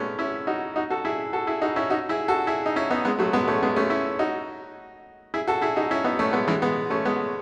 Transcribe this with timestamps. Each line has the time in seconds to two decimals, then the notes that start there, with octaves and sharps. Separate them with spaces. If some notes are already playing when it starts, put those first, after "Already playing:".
Already playing: G#3 A3 B3 C#4
0.19 C#4 E4
0.47 D#4 F#4
0.76 D#4 F#4
0.90 F#4 A4
1.05 E4 G#4
1.33 F#4 A4
1.47 E4 G#4
1.62 D#4 F#4
1.76 C#4 E4
1.90 D#4 F#4
2.09 E4 G#4
2.28 F#4 A4
2.47 E4 G#4
2.66 D#4
2.76 C#4 E4
2.90 B3 D#4
3.05 G#3 B3
3.19 F#3 A3
3.33 G#3 B3
3.48 A3 C#4
3.63 G#3 B3
3.76 A3 C#4
3.90 C#4 E4
4.19 D#4 F#4
5.34 E4 G#4
5.47 F#4 A4
5.61 E4 G#4
5.76 D#4 F#4
5.91 C#4 E4
6.04 B3 D#4
6.19 A3 C#4
6.33 G#3 B3
6.48 E3 G#3
6.62 G#3 B3
6.90 A3 C#4
7.05 G#3 B3